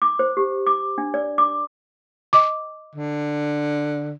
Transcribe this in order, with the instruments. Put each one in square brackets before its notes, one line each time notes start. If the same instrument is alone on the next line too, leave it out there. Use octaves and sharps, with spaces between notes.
[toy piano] D6
C5
G4
D6
D4
D5
D6
[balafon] D#5 D6
[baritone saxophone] D3